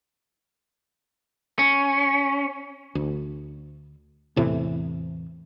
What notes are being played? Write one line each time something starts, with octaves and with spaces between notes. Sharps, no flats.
C#4
D2
E2 A2 C3 E3